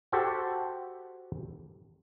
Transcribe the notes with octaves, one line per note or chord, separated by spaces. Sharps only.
F#4 G4 A4 C5 F#5